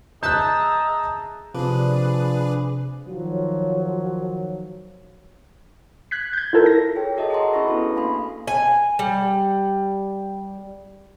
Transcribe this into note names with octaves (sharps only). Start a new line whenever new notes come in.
G#4 D#5 E5 A5 A#5 E6 F#6 G6
C3 F3 D4 G#4 B4
D#3 F3 F#3
F#6 G#6 B6
G6 G#6
E4 F4 A4 A#4
A#6
G#4 C#5 G5
F#4 A4 A#4 D#5 E5 A5
G#4 D#5 F#5 A#5 C6
C#4 E4 B5 C#6 E6 A#6
B3 D4 F#4 A4 B4
A#3 F5 G#5 B5 C6
G#5
G3